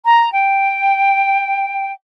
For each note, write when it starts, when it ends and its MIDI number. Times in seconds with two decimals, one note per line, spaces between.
0.05 0.29 82
0.31 1.91 79